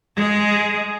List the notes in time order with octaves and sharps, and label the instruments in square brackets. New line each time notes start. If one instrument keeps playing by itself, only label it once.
[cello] G#3 G#4